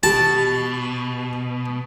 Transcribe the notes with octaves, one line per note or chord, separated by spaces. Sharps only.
B2 G4 A5